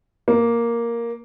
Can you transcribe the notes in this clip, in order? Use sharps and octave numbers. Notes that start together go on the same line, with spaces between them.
A#3